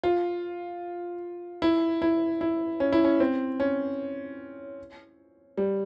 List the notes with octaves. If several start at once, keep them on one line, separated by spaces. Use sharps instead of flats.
F4
E4
E4
E4
C#4
E4
C#4
C4
C#4
G3